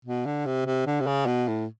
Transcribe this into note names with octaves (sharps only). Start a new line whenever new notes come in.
B2
D3
C3
C3
D3
C3
C#3
B2
A2